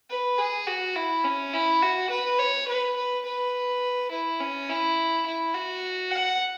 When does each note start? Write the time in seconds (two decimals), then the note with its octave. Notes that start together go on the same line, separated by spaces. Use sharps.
0.10 B4
0.38 G#4
0.67 F#4
0.96 E4
1.24 C#4
1.54 E4
1.82 F#4
2.10 B4
2.39 C#5
2.68 B4
2.96 B4
3.25 B4
4.11 E4
4.40 C#4
4.69 E4
5.26 E4
5.54 F#4
6.11 F#5